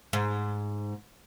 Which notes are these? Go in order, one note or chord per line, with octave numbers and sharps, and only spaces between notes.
G#2